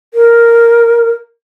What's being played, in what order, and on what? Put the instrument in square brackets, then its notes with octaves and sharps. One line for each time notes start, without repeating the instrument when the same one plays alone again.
[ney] A#4